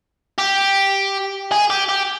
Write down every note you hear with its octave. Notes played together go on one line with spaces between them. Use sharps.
G4
G#4
G4
G4